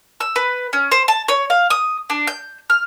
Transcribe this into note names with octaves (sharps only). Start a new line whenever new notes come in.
E6
B4
C#4
C5
A5
C#5
F5
D#6
D4
G6
F6